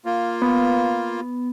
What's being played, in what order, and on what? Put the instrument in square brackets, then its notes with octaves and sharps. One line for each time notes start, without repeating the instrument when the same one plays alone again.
[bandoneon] A#3 F4
[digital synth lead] B3